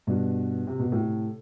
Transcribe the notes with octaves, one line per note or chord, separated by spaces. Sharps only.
G2 B2
C3
B2
A2 C3